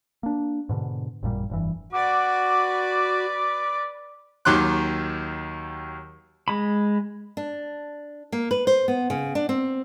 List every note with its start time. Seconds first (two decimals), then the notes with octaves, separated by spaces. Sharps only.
0.23 A#3 D4
0.69 G#2 B2 D3
1.23 A1 F#2 A#2 G3
1.50 F1 G2 E3
1.92 F#4 B4 D5 D6
4.45 D#2 D#3 F#3 C6 D6 F#6
6.48 G#3 B5
7.37 D4
8.32 A#3
8.51 B4
8.67 C5
8.88 B3
9.10 C#3
9.35 D4
9.49 C4